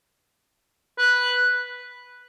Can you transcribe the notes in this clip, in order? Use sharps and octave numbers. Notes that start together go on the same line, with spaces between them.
B4